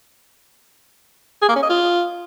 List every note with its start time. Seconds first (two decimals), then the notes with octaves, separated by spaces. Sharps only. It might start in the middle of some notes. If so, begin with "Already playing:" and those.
1.42 G#4
1.49 A#3
1.56 C#4
1.63 D#5
1.70 F4